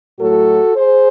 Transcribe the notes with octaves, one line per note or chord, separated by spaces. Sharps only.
A2 F#3 A3 F#4 A4
G#4 C5